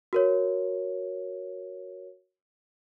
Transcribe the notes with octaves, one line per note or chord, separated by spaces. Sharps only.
F#4 A#4 C#5